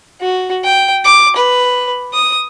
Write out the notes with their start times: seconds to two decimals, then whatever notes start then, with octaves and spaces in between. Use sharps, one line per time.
0.21 F#4
0.64 G5
1.04 D6
1.36 B4
2.13 D#6